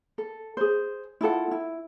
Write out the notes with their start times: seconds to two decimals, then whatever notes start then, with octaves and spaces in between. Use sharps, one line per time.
0.18 A4
0.57 G#4 C5
1.21 E4 F4 A4 F#5
1.51 E4